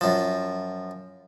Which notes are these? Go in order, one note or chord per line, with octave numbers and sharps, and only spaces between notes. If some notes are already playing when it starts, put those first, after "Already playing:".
F#2 F3